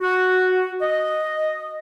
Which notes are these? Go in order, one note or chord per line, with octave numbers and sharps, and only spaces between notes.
F#4
D#5